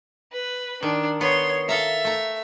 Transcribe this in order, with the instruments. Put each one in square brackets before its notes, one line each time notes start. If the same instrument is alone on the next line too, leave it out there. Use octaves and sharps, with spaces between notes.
[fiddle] B4
[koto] D#3 [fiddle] D4
[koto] B3 [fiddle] C#5 C6
[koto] A4 F5 A#5 [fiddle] E5
[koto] A3 A#5